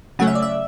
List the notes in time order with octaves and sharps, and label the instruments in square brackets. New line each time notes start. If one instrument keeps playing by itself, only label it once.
[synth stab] C#3 F#3 A3 C#4 F#5
E5
D5
E5